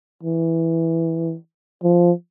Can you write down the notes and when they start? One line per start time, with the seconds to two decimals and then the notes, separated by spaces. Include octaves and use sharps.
0.23 E3
1.83 F3